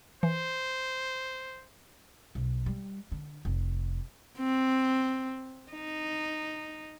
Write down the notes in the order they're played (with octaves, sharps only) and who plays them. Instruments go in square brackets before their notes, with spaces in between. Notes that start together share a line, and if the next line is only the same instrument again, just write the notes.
[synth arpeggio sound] E3 [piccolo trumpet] C5
[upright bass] B1
G3
D3
F1
[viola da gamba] C4
D#4